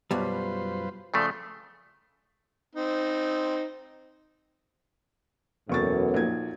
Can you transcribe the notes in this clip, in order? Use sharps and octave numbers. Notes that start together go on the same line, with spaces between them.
F#2 B2 G3 F4 B4 C5
C#3 F3 A3 D5 G5 C6
C4 D#4
E1 F#2 A2 B3 C#6 A6
A#1 D#4 G#6